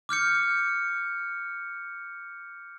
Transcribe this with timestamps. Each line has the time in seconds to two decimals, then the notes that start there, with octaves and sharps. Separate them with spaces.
0.09 D6 F6 G6 C#7